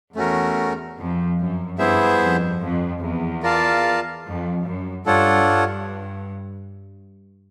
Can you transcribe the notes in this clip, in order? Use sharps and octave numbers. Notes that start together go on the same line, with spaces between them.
E2 A3 C#4 F#4 A#4
F2
F#2
G2 B3 E4 G#4 C5 E5
F2
F2
E2
F4 A#4 D5 F5 A5
F2
F#2
G2 D4 F4 A4 C#5 F#5
G2